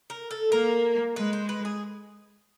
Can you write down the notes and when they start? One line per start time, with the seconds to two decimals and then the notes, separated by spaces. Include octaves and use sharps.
0.10 A#4
0.31 A4
0.52 A#3 A#4
1.16 G#3 B4
1.33 C5
1.49 B4
1.65 G#4